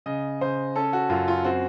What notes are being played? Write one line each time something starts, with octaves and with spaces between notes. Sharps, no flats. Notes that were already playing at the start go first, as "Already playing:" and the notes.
C#3 D#5
C#3 C5
C#4 A4
F#4
F#2 F4
F4
C4 F#4